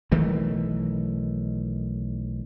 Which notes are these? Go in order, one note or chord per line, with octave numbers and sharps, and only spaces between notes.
B1 D#3 E3 A3